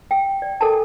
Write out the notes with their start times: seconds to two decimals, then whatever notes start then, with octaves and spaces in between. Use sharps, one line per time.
0.11 G5
0.42 D5
0.61 A4 A#4 G#5 A5